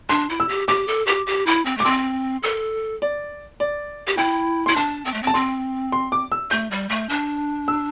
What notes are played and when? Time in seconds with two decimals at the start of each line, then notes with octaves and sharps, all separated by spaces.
0.09 D4 C6
0.29 E4
0.40 E6
0.49 G4
0.68 G4 D6
0.88 A4
1.07 G4
1.26 G4
1.47 E4
1.65 C4
1.77 A3
1.80 D6
1.84 C4 C6
2.43 A4
3.02 D5
3.60 D5
4.07 G4
4.17 E4 G5
4.66 E4 C6
4.76 D4 A5
5.05 C4
5.14 A3
5.23 C4
5.27 A5
5.34 C4 C6
5.92 C6
6.12 D6
6.32 E6
6.51 A3 G6
6.71 G3
6.89 A3
7.09 D4
7.68 E6